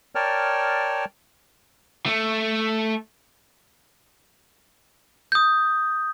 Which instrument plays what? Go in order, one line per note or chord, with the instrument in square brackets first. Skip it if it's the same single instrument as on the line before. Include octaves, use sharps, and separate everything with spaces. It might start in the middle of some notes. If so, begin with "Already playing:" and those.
[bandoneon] A#4 C#5 D5 G5 A5 F6
[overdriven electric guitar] A3
[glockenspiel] D#6 G6